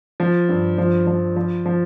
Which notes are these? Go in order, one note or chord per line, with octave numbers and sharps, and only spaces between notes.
F3
G2
F3
F3
F3
F3